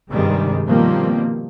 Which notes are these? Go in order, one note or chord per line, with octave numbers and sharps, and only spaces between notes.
G2 C3 D#3 G3 G#3
B2 D#3 F3 G3 A#3 C4